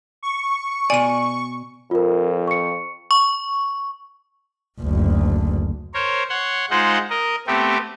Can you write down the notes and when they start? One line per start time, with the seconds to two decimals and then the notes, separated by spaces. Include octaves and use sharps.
0.23 C#6
0.90 B2 D5 G#5 D#7
1.91 F2 F4 A#4
2.48 C#6 C#7
3.11 C#6
4.81 F#1 D2
5.94 A#4 C5 C#5
6.30 C#5 F#5 C6
6.70 G#3 D#4 F4 C5 F#5
7.10 A#4 D#5
7.47 A3 B3 C4 G4